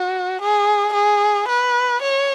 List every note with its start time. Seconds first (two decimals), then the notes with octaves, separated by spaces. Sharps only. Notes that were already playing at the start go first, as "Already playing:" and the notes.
Already playing: F#4
0.41 G#4
0.94 G#4
1.48 B4
2.02 C#5